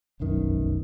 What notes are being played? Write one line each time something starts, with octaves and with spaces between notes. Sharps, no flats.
F1 B1 F#2 D#3